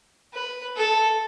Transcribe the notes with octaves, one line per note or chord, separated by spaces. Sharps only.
B4
A4